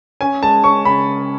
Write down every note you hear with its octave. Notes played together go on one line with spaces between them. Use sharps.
C#4 G#5
G#3 A5
C#4 C#6
C#3 B5